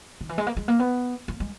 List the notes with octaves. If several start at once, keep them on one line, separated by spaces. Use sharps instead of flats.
D#3
E3
G#3
A#3
G#3
A#3
B3
A#3
G#3